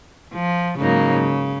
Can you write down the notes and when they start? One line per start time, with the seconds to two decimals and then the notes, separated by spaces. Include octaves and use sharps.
0.34 F3
0.78 G#2 C#3 F#3 A#3 D#4